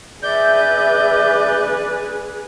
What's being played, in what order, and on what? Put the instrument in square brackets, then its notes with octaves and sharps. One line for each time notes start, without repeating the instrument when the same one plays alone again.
[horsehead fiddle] G#4 B4 [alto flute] D5 [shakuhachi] E5 [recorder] G6